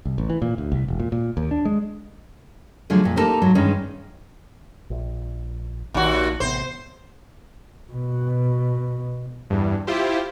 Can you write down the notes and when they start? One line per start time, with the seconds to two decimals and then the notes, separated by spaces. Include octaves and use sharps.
0.05 C2
0.18 A1
0.30 E3
0.42 A#2
0.58 D2
0.72 C2
0.88 E1
1.00 A#2
1.12 A#2
1.37 D#2
1.51 D4
1.65 G#3
2.90 D3 F3 F#3 A3 F4 G#4
3.04 F2 A#2
3.16 A#3 D#4 G4 A4 A#4 C5
3.42 G#2 F#3
3.55 G2 D#3 E3 G#3 C#4
4.90 A#1
5.94 A#1 D#2 A#2 F#4
6.40 A1 C3 B3 C5
7.92 B2
9.50 E2 G2
9.87 E4 F4 G4 C5